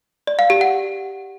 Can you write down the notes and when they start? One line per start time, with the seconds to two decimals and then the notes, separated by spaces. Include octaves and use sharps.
0.27 D5
0.39 F5
0.50 G4
0.61 F#5